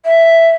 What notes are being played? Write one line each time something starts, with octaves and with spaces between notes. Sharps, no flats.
E5